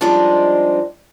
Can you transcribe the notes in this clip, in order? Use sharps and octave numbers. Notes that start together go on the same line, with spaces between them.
F3 G3 G#3 C4 D4 D#4